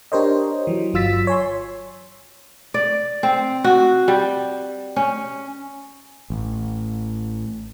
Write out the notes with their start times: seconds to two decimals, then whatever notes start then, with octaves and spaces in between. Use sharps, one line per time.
0.12 D4 G4 A#4 C5 C#5 D#5
0.67 E3 F#3
0.94 G1 F#3 F4 E6 A6 B6
1.27 C#5 G#5 C6
2.74 D5
3.23 C4
3.64 F#4
4.08 G3
4.96 C#4
6.30 A1